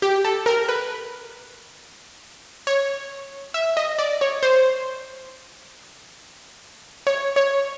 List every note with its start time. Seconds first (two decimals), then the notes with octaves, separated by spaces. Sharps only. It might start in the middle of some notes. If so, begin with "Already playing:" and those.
0.02 G4
0.25 A4
0.46 A#4
0.69 B4
2.67 C#5
3.54 E5
3.77 D#5
3.99 D5
4.21 C#5
4.43 C5
7.07 C#5
7.36 C#5